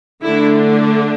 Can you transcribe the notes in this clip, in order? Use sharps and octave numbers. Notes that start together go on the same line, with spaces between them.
D3 A3 D4 E4